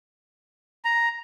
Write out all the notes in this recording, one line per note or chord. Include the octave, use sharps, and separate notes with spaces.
A#5